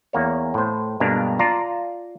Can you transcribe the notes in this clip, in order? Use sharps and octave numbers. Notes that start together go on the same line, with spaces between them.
E2 A#3 C#5
A2 C5
G2 B2 G#3 A#3 D4 F5
F4 D5 A5 A#5